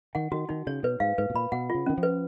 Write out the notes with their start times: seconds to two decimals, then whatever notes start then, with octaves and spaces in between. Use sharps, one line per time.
0.15 D#3 F#5
0.32 D#3 F#4
0.49 D#3 D#4
0.67 C#3 C#5
0.83 B2 B4
1.00 G#2 F5
1.18 G#2 B4
1.30 B2
1.34 A#2 B5
1.52 B2 F#5
1.70 C#3 F4
1.86 D#3 C#4
1.98 F3
2.03 B4